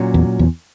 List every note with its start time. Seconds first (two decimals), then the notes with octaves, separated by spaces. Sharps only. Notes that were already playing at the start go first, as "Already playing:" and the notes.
Already playing: A#2 F#3 C#4
0.14 E2
0.39 E2